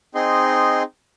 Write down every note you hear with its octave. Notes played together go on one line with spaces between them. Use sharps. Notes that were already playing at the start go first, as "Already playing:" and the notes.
C4 D#4 G#4 D#5 C6